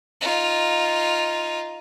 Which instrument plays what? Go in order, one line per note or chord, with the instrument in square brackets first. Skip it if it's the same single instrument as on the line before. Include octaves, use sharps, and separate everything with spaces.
[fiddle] D#4 F4